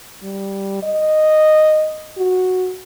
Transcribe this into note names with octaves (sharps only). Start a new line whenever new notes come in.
G3
D#5
F#4